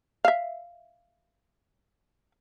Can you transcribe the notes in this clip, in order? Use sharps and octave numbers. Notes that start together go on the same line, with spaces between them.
E5 F5